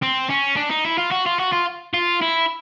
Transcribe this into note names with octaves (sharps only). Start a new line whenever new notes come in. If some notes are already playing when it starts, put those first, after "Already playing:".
C4
C#4
D4
D#4
E4
F4
F#4
F4
F#4
F4
F4
E4